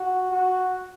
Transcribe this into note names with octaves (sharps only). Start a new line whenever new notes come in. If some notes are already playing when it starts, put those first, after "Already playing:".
Already playing: F#4
F#4